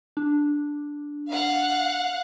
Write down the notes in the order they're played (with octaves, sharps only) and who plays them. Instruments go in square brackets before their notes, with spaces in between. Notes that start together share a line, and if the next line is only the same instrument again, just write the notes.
[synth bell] D4
[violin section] F5 F#5